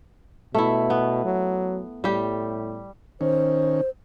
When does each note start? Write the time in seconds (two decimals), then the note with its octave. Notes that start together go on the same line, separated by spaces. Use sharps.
0.55 B2 A3 E4
0.90 B3
1.25 F#3
2.04 A2 G3 G4
3.21 D#3 C#4 C5